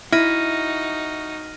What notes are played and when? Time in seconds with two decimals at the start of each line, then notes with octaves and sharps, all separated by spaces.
0.13 D#4 E4 F#4 F6 A#6 D#7